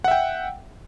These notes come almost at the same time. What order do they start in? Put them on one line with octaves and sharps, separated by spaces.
F#5 E5 G5